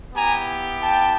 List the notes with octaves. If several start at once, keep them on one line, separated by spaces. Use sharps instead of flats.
B3 E4 G4 G#5 A#5
G5 A5